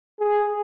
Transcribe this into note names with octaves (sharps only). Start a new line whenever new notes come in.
G#4